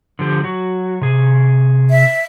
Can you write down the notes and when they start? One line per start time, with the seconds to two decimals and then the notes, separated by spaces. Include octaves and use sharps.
0.19 D3 F3 G4
0.44 F#3 F#4
1.01 C3 G#4
1.90 E5